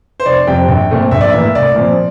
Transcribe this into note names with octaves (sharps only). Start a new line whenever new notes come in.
C5
F1 D5
F2 C3 G3 C4 G5
A#1
A#2 A3 C4
A#1 E5
D5
A2 E3 A#3 E5
C2 D5
A#2 F3 C4